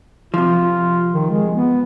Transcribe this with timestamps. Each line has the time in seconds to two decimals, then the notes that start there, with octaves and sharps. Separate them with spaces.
0.34 C3 F3 F4
1.13 D#3
1.30 G#3
1.53 B3